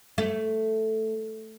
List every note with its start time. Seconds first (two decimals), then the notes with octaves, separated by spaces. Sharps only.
0.18 A3